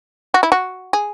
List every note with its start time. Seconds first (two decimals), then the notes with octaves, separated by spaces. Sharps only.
0.34 F#4
0.43 E4
0.52 F#4
0.93 G#4